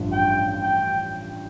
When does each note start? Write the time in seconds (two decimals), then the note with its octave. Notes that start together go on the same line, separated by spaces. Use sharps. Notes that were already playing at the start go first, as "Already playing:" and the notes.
Already playing: A1 G2 F3
0.12 G5
0.63 G5